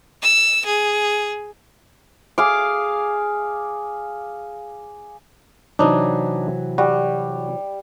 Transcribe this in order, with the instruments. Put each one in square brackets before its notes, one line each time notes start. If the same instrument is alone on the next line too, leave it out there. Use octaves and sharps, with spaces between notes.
[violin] E6
G#4
[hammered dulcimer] G#4 F5 D6
[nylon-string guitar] C3 E3 F#3 [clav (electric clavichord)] D4 D#4
[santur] G3 [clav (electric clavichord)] F#4